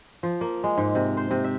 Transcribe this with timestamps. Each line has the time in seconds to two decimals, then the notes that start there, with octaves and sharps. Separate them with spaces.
0.23 F3
0.41 A#3
0.64 G#3
0.78 G#2
0.95 C3
1.17 C5
1.31 C3
1.44 E5